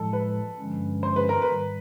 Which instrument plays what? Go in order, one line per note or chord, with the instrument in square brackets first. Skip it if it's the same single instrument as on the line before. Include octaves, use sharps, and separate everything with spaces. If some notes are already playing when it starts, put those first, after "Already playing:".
Already playing: [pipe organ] A2 F3 G#3 [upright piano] A4
[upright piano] B4
[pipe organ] G2 D3 F3 G#3 C#4
[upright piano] C5
B4
A#4
B4
[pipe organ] G#2 D#3 G3